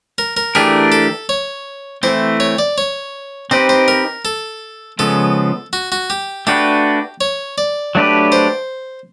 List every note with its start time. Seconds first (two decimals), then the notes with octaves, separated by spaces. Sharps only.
0.18 A#4
0.37 A#4
0.55 E3 A3 D4 G4 G#4 A#4
0.92 A4
1.29 C#5
2.03 E3 A3 C4 E4 C5
2.40 C#5
2.59 D5
2.78 C#5
3.51 C4 D#4 G4 B4 C5
3.69 C5
3.88 A#4
4.25 A4
4.99 C#3 F3 G#3 B3 A4
5.73 F#4
5.92 F#4
6.10 G4
6.47 A3 D4 F#4 G4 B4
7.21 C#5
7.58 D5
7.95 F#3 A3 D4 G4 B4
8.32 C5